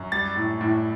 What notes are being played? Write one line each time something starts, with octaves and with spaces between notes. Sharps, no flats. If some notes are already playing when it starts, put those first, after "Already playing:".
Already playing: F#2
G3 A6
A2
A2